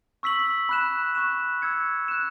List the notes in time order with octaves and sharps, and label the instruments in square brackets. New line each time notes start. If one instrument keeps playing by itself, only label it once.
[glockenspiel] C#6 E6 B6 F#7
B5 F#6 E7
C#6 F#6 E7
E6 G#6 C#7
F#6 E7